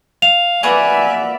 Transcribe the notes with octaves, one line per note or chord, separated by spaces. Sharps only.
F5 F7
A#3 F#4 B4 D5 E5 G#5